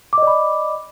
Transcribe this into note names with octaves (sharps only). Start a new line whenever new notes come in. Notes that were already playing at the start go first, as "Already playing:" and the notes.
D5 D#5 B5 D6